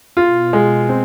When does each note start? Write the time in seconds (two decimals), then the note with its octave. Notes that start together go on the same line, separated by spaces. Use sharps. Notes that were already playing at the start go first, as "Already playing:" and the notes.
0.17 B2 F4
0.53 G#3
0.89 C4